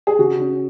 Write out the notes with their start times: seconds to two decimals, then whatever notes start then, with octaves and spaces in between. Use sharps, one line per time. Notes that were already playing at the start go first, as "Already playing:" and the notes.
0.07 G#4
0.19 C#3 F#4
0.40 C#4